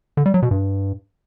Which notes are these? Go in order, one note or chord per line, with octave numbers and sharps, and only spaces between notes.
D3
G3
F#3
B2
G2